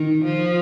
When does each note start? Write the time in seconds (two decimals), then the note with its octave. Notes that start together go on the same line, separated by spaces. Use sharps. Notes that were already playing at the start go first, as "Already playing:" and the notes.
Already playing: D#3
0.24 F3